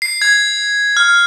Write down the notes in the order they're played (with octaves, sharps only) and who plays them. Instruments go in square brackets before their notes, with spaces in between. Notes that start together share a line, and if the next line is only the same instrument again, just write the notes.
[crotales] C7
G#6
F6